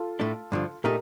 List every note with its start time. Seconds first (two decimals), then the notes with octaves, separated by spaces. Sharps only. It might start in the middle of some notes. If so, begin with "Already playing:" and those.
Already playing: F4 A4
0.20 A2 A3 D4
0.52 G2 D3 F3
0.84 A#2 A3 D#4 G4 A#4